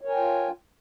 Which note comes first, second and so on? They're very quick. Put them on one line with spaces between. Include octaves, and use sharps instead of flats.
C#5 A#4 G#5 G5 F4